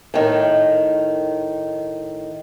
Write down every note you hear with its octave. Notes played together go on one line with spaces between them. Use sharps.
A2 D#3